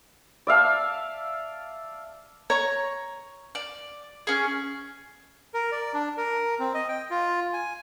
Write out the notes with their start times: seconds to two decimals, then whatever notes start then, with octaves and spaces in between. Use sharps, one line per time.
0.47 D5 E5 F5 A5
2.50 C#5 A#5 C#6
3.55 D5
4.27 C#4 G#4
5.54 A#4
5.72 D5
5.94 D4
6.17 A#4
6.59 C4
6.74 D#5
6.88 G5
7.10 F4
7.53 G#5